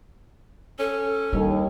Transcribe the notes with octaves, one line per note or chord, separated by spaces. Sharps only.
C#4 A4
D#2 G3 D4